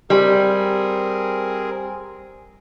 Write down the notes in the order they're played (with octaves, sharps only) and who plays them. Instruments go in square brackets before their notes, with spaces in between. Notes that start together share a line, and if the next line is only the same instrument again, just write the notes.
[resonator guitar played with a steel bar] G3 [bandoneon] C4 G#4 A#4